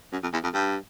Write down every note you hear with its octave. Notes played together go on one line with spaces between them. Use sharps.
F#2
F2
E2
F2
G2